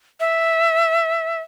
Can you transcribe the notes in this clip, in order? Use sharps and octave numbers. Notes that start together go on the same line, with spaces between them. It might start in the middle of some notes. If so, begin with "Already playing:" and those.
E5